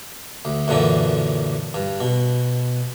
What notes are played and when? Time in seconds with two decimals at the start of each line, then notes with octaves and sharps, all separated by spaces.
0.45 D2
0.68 F#2 A#2 D3 E3
1.74 G2
2.00 B2